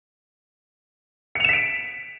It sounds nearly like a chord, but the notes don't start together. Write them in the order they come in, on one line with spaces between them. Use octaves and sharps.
C#7 F7 E7 B6 D7